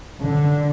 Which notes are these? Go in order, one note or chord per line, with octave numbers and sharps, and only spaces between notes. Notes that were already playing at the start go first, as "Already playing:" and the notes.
D3